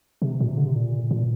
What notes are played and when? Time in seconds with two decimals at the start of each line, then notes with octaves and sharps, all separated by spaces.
0.22 C3
0.40 A#2
0.48 C3
0.57 D3
0.67 C3
0.76 A#2
1.11 A#2